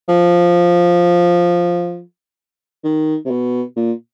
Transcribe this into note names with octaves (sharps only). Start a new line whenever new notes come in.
F3
D#3
C3
B2
A#2